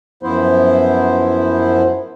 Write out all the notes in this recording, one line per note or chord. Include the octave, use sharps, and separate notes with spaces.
F#2 F3 B3 E4 C5